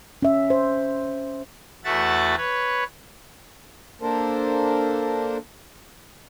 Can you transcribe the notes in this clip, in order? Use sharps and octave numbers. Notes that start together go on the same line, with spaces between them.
C#4 E5
C5
E2 A3 F#4 E5 F#5 A6
B4 C#5
A#3 D4 A4 A#4 C5